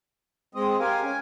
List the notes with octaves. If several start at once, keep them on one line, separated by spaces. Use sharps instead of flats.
G#3 C4 D#5
G4 A#4 F5 G#5
C#4 G#5